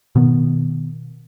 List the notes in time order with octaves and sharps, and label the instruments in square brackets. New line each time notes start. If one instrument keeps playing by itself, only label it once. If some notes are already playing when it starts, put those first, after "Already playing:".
[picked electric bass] B2 D#3 B3